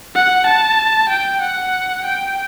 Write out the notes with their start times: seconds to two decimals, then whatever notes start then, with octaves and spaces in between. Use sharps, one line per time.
0.15 F#5
0.47 A5
1.10 G5
1.41 F#5
2.05 G5